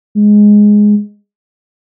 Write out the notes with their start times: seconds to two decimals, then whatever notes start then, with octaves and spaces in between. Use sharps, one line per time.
0.15 G#3